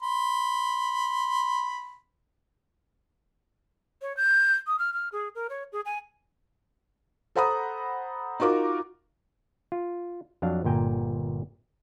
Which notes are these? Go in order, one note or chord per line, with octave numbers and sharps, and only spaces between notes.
B5 C6
C#5
G6
D#6
F6
F6
G#4
A#4
C#5
G#4
G#5
A4 C5 F#5 A#5 B5 D#6
D#4 F4 F#4 A#4 D6
F4
F2 F#3 D4 F5
G1 A#2 G5 G#5 A#5